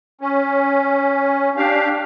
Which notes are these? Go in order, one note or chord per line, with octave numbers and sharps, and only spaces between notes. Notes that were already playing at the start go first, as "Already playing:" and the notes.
C#4
D4 G4 F5